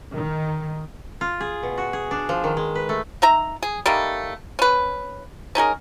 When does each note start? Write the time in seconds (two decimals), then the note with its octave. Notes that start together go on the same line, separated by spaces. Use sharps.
0.13 D#3
1.21 F4
1.41 G#4
1.63 B2
1.78 F#4
1.93 G#4
2.11 D4
2.29 F3
2.44 D#3
2.57 G#3
2.75 B4
2.89 A3
3.22 D#4 E5 A#5
3.63 G#4
3.86 G3 A3 A#3 D#4
4.59 C#4 B4
5.55 C#4 D#4 G#4 A#4